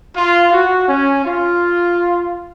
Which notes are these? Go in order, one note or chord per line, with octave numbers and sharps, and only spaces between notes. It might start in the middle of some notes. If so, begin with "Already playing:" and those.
F4
F#4
C#4
F4